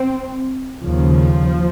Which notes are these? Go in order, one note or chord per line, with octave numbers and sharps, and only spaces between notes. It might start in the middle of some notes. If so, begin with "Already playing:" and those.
Already playing: C4
D#2 C#3 F3